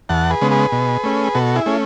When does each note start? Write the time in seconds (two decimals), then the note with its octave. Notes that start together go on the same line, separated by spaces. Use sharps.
0.09 E2 F#5 A5
0.30 G#4 B4
0.41 C#3 G#3 B3
0.51 G#4 B4
0.72 B2
1.04 A3 C#4
1.35 B2 F#4 A4
1.56 E4 G#4
1.66 A3 C#4 G#4